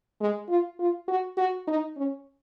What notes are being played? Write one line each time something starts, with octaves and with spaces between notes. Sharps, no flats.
G#3
F4
F4
F#4
F#4
D#4
C#4